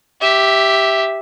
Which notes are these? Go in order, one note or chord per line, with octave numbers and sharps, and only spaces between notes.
G4 E5